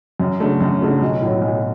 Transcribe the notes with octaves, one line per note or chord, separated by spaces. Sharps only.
F#2
C#3 F#3 A3 D4
F#2
C#3 F#3 A3 D4
B1
A2 F#3
B1